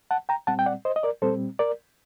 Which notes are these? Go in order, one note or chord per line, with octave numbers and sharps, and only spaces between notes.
F#5 A5
G5 A#5
A#2 G3 C4 F#5 A5
G5
D5 F#5
C5 D#5
D#5
A#4 D5
A#2 G3 C4 A4 C5
A#4 D5